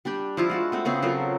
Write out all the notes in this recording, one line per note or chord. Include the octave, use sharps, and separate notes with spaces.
G3 D4 G4 D5
F3 E4 F4
G#3 F#4 A5
A3 C4 F#4
C#3 B3 C4 G#4
F#3 F4 A4 A#4